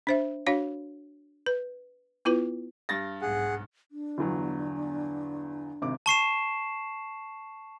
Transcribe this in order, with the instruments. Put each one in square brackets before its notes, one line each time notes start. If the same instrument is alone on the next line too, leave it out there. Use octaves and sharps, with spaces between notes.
[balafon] D4 C5 E5
D4 F#4 C#5 F5
B4
B3 E4 F4 B4
[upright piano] G2 A6 A#6
[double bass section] B1 G#2 [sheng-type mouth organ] G#4 F#5
[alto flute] D4
[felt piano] G1 E2 F#3
G#1 C3 D6
[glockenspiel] A5 C#6 C7 E7